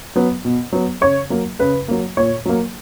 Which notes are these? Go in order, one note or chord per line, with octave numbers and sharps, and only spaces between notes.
F#3 B3
B2
F#3 B3
C#3 C#5
F#3 A#3
C#3 B4
F#3 A#3
A#2 C#5
F#3 A#3